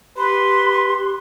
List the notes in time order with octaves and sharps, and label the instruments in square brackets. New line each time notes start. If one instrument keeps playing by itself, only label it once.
[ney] G4 [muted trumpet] B4 [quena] C6